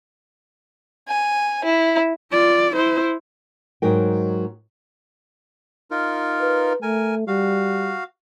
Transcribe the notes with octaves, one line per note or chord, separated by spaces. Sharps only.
G#5
E4
F4 D5
E4 C5
G#2 F#3 D#4 A#4 G5
D#4 F4 A#4
B4
A3 A#4 G#5
G3 F#4 F5